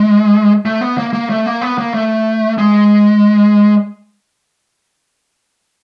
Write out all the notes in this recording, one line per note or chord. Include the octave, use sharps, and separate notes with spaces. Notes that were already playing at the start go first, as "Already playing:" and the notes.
Already playing: G#3
A3
B3
A#3
A#3
A3
A#3
B3
A#3
A3
G#3